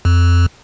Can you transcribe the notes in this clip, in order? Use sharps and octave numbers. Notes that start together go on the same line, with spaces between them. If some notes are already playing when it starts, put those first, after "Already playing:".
F2